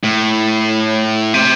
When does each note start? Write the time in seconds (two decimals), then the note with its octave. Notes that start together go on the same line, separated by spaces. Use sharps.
0.03 A2
1.34 C3